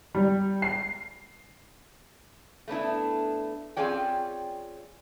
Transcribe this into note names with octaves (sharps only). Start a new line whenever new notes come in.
G3
C7
A3 B3 D4 E4
C4 C#4 F4 G#4 D5 G5